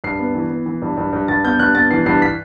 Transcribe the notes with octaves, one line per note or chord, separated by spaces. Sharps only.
G2 C7
B3
E3
B3
E3
G2
G2
G2
G2 A6
B3 G6
G2 F#6
B3 A6
E3 C7
G2 C7
B6